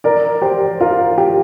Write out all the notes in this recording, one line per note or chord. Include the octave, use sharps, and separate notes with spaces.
A#4 D5
G4 C5
F4 A#4
G4